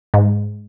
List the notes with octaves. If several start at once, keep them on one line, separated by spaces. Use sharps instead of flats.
G#2